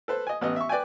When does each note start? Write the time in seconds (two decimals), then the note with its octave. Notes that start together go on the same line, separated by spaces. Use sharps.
0.08 A4 B4 C5
0.27 D#5 G#5
0.41 A1 B3 D#5
0.56 E5 C#6
0.69 B4 D5 G5 G#5